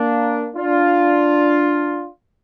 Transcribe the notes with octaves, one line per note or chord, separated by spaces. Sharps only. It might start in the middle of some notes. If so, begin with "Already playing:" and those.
Already playing: A#3 D4
D4 F4